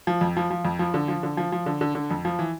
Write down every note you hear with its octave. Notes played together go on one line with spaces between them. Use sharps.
F3
F2
F3
F3
F2
F3
D3
F3
D3
F3
F3
D3
D3
D3
F2
F3
E3